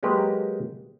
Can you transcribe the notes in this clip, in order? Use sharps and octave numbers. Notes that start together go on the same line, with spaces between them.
F#3 G#3 A#3 G4 B4